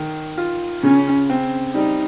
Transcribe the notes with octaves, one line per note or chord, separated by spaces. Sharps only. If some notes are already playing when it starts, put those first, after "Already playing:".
Already playing: D#3
F4
C#3 C#4
C4
G3 D#4